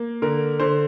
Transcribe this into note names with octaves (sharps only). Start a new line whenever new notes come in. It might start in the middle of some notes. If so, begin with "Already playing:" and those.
Already playing: A#3
D3 A#4
D3 C5